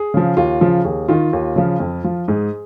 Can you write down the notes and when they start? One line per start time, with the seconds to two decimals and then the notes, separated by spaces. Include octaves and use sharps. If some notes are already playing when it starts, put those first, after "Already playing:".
Already playing: G#4
0.14 C#3 F3
0.37 D#2 F4
0.61 C#3 F3
0.85 D#2 G#4
1.08 D#3 F4
1.33 D#2
1.56 C#3 F3
1.80 F2
2.04 F3
2.28 G#2 G#4